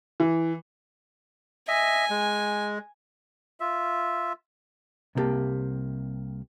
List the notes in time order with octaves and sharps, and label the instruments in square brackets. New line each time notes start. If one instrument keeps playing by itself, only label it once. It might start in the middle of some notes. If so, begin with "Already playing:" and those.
[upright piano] E3
[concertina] D#5 E5 [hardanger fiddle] G#5
[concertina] G#3
[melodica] F4 E5
[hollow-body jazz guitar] C2 C3 D#3 A#3 G4 A5